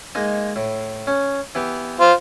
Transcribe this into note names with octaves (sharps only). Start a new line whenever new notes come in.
G#3 A#3 D#4
A2
C#4
E3 B3 G4
F4 C5